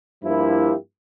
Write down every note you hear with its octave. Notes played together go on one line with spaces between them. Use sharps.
G2 F3 A#3 E4 G4